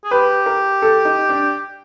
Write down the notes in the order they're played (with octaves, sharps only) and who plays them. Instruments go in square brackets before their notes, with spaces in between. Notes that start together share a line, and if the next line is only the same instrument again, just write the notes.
[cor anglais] G#4
[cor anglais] G4 [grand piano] B4
[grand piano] A#4
A4
D#4
D4